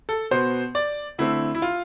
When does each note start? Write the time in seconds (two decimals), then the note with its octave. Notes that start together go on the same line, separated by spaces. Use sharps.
0.09 A4
0.31 B2 B3 C5
0.75 D5
1.18 D3 A3 C4 E4
1.55 E4
1.62 F4